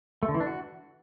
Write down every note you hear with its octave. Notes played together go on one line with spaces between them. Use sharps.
A3
D3
E3
D4
F#4